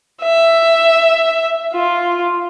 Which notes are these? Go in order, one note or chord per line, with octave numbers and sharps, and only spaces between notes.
E5
F4